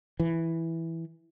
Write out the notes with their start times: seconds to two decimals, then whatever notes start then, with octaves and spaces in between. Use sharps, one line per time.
0.20 E3